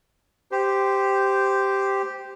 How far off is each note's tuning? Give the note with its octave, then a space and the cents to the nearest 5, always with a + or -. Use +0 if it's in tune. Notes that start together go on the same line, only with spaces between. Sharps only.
G4 +0 C5 -10